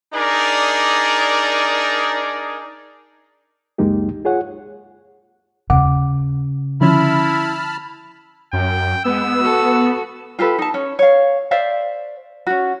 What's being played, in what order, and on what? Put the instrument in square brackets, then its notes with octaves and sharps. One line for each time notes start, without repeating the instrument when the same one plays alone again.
[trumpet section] D4 D#4 G#4 A#4 D5
[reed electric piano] C#2 F#2 G#3 A#3 D#4 G4
F4 G#4 C#5 F#5
[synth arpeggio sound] D#2 F#5 D6 [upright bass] C#3
[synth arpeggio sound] D3 F3 C#4 [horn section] E4 [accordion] A5 B5 F6
[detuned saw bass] F#2 [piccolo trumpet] G5
[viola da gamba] G#3 [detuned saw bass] B3 [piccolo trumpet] E6
[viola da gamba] F#4 A4
[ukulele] F4 G4 A4 B4
D#4 A5
C#4
C#5 F5
C5 D5 E5 F5
C#4 F#4